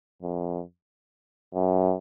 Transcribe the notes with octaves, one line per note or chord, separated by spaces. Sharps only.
F2
F#2